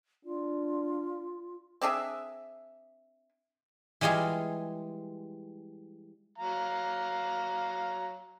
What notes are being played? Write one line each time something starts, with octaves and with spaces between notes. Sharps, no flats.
D4 F4
C4 D4 G#4 E5
E3 G3 G#3 F4 G#4
F#3 F5 A#5